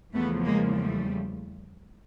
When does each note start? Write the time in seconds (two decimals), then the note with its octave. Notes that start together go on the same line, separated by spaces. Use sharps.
0.14 E2 C#3 F3 A3 B3
0.45 G#3 A#3
0.77 G3 A3